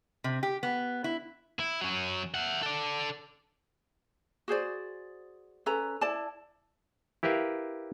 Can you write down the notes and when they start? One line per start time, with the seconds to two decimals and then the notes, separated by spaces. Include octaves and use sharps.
0.24 C3
0.43 G4
0.63 B3
1.04 E4
1.59 E4
1.81 F#3 C#4
2.34 E5 F#5
2.62 A4 D5
4.48 F#4 G#4 C5 D5
5.66 C#4 A4 B4 A#5
6.01 E4 D5 A5
7.23 E4 G4 A#4 B4 E5 F5